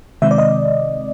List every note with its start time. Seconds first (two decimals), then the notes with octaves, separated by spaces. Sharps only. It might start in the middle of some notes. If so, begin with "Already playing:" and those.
0.22 C3 D#3 G#3 C4 E5
0.31 D5
0.38 D#5